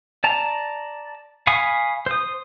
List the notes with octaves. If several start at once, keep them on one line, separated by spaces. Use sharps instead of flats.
D5 A5 A#5
F5 G#5 B5 C#6 D#6
C5 D#6